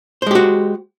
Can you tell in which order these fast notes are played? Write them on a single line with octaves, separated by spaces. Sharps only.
C5 G#3 G4 F#4